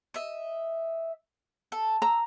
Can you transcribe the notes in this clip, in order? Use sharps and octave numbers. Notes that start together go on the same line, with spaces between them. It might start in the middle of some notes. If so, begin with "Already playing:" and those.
D#5 E5
A4
A#5 E6